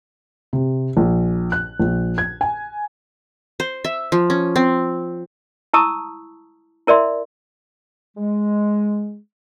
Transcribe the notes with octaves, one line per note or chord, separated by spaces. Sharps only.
C3
A#1
F#6
A#1
G#6
G#5
C5
E5
F3
C#4
C4
E4 A5 A#5 C#6 D#6 E6
E4 A#4 D5 E5 C6
G#3